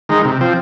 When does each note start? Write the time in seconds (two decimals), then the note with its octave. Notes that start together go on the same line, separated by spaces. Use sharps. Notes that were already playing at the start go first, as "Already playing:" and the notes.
0.09 D#3 G#3 D#4
0.25 C3
0.41 F3 C4